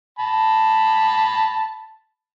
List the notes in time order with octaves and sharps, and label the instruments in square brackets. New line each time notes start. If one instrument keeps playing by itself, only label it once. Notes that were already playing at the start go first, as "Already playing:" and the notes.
[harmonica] A5 B5